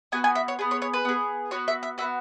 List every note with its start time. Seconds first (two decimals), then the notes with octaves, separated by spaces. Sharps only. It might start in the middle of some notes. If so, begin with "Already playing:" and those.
0.12 B3 F#4 G#5
0.24 G#5
0.35 E5
0.48 C#5
0.59 B3 G#4
0.71 C#5
0.82 C#5
0.93 B4
1.05 B3 G#4
1.51 B3 F#4 C#5
1.68 E5
1.83 E5
1.98 B3 F#4 E5